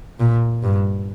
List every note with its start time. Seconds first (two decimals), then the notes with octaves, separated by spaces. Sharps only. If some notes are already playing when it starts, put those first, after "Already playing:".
0.20 A#2
0.63 G2